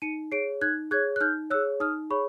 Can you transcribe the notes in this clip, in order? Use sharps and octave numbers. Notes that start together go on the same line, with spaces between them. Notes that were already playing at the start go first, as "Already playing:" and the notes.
D#4 C#7 D#7
G#4 C#5 C7 D7
D#4 F#6 G#6
G#4 C#5 F#6 G#6
F#6
D#4 F6 G6
G#4 C#5 E6 F#6
D#4 D#6 F6
G#4 C#5 B5 C#6